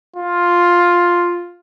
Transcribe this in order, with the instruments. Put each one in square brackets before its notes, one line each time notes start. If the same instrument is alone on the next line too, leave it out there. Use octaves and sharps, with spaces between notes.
[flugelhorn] F4